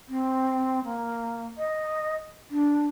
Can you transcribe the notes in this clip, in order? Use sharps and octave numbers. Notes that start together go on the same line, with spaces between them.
C4
A#3
D#5
D4